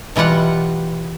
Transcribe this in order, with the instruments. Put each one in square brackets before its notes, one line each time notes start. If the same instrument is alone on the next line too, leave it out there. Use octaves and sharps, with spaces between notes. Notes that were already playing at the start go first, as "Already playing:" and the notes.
[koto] B2 E3 G3 F4 F#5